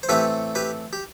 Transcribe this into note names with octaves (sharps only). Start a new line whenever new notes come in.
C5
A2 E3 A3 C4 G4 B4
G4 B4
G4